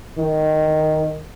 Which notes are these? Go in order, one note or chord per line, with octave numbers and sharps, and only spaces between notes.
D#3